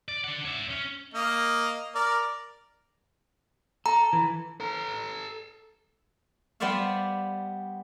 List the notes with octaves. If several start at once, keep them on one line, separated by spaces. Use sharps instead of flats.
D5
D4 F#5
C#5 E5
C#4
A#3 D#5
A#4 D5
A4 A#5
E3
A4 A#5
G3 B3 C5 D5 E5 F5